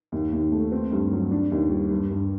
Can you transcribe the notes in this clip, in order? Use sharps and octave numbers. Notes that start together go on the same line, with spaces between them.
D#2
D#2
A3
C4
G2
F#3
D4
D#2
G3
G2
G2